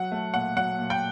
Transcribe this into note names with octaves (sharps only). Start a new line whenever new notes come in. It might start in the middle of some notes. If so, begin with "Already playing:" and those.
Already playing: F#3 F#5
A3
A#2 F#5
F#3 F#5
A#2
G5